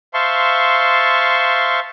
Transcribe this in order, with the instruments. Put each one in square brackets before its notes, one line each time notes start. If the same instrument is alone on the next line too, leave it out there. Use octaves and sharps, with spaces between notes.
[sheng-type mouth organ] C5 E5 F5 A5 C6 C#6